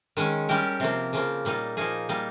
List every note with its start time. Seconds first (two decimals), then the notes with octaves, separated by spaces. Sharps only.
0.17 D#3 G#3 C#4
0.49 G3 C#4 G4 A#4
0.80 C3 F3 A#3
1.13 C#3 F3 A#3
1.45 A#2 G3 A#3 D#4
1.77 F3 A#3 D#4 G#4
2.09 G3 A#3 D#4